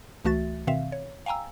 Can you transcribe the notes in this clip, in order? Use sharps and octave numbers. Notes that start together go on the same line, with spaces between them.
C#2 E3 A3 F#4 E5 A6
B2 D#3 C4 E5 F5
C#5
F5 G5 G#5 A#5 E6